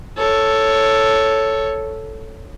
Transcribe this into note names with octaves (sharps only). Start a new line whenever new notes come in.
A4 C#5